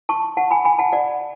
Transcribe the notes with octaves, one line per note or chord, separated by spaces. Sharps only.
A5 C#6
F#5 A5
G#5 B5
G#5 B5
F#5 A5
D5 F#5